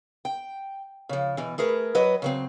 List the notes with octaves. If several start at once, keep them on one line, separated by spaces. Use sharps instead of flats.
G5
C#3 F3
B2 E3
A3 G#4 A#4 B4
F#3 B4 D#5
C#3 F#3 C4